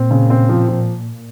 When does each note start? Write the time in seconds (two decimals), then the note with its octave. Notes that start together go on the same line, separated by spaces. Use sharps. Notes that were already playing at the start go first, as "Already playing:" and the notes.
Already playing: A#2 C4
0.11 C#3
0.30 C4
0.49 F3
0.68 F3